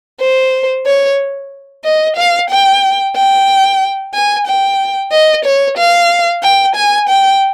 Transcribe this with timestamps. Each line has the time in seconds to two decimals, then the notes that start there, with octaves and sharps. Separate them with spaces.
0.20 C5
0.86 C#5
1.84 D#5
2.17 F5
2.50 G5
3.15 G5
4.14 G#5
4.47 G5
5.11 D#5
5.45 C#5
5.77 F5
6.43 G5
6.75 G#5
7.09 G5